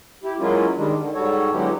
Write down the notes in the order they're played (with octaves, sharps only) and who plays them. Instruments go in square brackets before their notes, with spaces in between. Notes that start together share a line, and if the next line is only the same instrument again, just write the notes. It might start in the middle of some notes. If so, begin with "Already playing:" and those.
[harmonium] E4 G4
F#3 G#3 A#3 C#4 E4 F4
D#3 G3 G#3 D4
D3 D#3
G#2 G3 F#4 A4 C#5
D3 F#3 G#3 B3 E4 G4